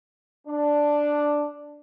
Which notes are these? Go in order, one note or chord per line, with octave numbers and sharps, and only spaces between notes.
D4